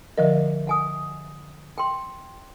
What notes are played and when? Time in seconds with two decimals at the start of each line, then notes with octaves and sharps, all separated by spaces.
0.18 D3 F3 A#4 D#5 E5
0.67 F#5 G#5 D#6
1.78 G5 C6